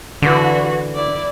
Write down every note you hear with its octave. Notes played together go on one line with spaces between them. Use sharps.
D3 E3 F#4
E4 D5